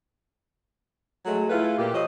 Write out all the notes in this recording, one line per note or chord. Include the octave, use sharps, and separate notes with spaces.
F#3 G#3 A3
A3 E4 F4 G#4 B4
A#2 G4
F3 F#3 D#5